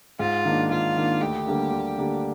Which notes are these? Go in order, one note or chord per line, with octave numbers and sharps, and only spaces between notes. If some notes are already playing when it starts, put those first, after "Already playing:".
G#2 F4
D#3 A#3 D4
G#2 F4
D#3 A#3 D4
D2 G4
D3 G3 A#3 D4
D2
D3 G3 A#3 D4